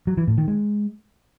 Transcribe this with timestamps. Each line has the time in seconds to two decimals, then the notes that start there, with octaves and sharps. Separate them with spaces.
0.07 F#3
0.17 E3
0.27 A2
0.38 D#3
0.48 G#3